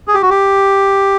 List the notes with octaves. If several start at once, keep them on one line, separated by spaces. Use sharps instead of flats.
G#4
G4
F#4
G4